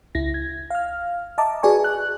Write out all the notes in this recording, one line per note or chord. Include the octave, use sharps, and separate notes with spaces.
C#2 E4 A#6
G#6
F5 F6
D#5 E5 A5 A#5 D6
F#4 G#4 B4 D5 G#5 C#6
F#6